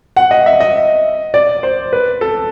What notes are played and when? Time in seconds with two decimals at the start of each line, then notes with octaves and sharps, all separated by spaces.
0.16 F#5
0.31 D#5
0.46 E5
0.60 D#5
1.34 D5
1.63 C5
1.93 B4
2.21 A4